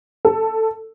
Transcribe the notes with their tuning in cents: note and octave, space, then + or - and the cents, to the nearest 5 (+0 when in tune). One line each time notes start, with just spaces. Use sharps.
A4 +10